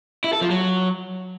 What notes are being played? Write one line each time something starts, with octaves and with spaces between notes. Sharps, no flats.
E4
A4
F3
F#3